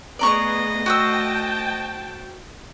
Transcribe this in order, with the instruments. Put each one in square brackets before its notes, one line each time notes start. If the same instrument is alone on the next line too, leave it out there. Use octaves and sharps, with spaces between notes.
[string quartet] A3 D#5 [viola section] B3 G#4 [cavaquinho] D5 A#5 C#6
[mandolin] F#4 C5 E6 [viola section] G5 A5